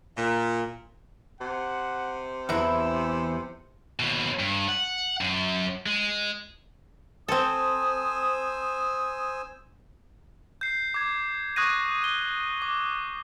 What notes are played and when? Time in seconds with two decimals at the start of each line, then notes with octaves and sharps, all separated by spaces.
0.17 A#2
1.41 C3 F#5
2.49 E2 E3 F#3 A3 E4 E6
4.00 D#2 B2
4.39 G2
4.68 F#5
5.21 F#2
5.86 G#3
7.28 C4 A4 C5 G#5 D#6 E6
10.61 G6 C7
10.94 D6 G#6
11.56 C#6 D#6 F#6 G#6 A#6 D#7
12.04 G7
12.62 D6